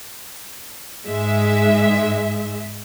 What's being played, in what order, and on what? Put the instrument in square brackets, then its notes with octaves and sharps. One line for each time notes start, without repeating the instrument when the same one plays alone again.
[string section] G#2 G#3 E5